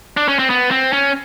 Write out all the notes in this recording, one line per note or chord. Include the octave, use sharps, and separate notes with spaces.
D4
C#4
C4
B3
C4
C#4